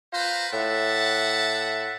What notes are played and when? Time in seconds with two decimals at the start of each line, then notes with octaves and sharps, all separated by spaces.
0.13 F4 B4 C5 A#5
0.53 A2 E5 F#5 A5